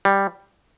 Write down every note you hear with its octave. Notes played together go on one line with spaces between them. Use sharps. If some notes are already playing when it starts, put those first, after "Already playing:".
G3